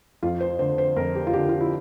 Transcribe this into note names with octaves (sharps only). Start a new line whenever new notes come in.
F2 F4
C5
D3 C5
C5
F2 A#4
G4
F4
D3 G4
F4
E4